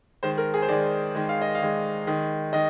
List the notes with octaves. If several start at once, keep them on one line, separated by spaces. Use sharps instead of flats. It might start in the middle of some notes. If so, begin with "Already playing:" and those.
D#3 G#3 C5
A#4
G#4
C5
D#3 G#3 D5
D#3 G#3
F5
D#5
F5
D#3 G#3
D#3 G#3
D#3 D#5